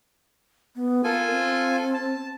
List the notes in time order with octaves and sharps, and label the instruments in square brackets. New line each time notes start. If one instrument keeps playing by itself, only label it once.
[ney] B3
[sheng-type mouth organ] F4 A4 G#5 [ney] A#4
[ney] C4
[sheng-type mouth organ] A5